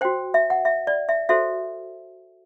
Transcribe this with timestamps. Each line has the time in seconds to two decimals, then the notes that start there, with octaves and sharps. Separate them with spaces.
0.01 F#4 C5 G5
0.34 E5
0.50 F#5
0.65 E5
0.87 D5
1.09 E5
1.29 F#4 A4 C5 E5